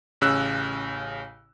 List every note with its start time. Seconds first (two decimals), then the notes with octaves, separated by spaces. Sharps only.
0.21 A1 C#3 E6 F#6